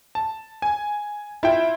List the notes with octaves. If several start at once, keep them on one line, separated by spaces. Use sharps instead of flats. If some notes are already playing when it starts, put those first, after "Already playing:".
A5
G#5
E4 F4 E5 G5